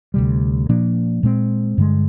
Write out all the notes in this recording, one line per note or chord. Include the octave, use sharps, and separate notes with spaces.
D2 C3 G3
A#2 F3 A#3 D4
A#2 G#3 C4
G2 D3 G#3